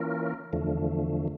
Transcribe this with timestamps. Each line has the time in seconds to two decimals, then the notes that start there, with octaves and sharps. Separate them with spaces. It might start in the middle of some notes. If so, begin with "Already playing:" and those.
Already playing: E3 A#3 C#4 F4 A#4
0.53 E2 D3 F3 A3